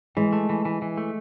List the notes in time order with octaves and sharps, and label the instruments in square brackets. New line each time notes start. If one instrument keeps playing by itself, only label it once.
[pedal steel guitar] E3 [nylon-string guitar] G#3
[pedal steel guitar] A3
E3
E3
E3
A3